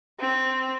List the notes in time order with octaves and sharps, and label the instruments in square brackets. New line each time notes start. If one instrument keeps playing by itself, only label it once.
[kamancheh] C4